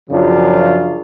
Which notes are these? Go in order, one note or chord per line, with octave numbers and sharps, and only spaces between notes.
F#2 C#3 F3 F#3 D4 F4